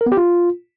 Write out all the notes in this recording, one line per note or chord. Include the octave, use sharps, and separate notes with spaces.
A#4
B3
G4
F4